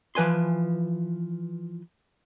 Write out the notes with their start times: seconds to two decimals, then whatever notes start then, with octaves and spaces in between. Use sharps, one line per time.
0.15 E3 F3 B4 G#5 C6